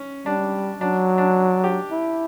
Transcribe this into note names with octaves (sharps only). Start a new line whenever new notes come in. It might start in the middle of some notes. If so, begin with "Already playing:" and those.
Already playing: C#4
G3 D4
F#3 D4
D4
G4
E4